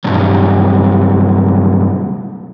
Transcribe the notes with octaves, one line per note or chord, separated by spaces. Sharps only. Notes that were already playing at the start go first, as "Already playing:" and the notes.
B1 G2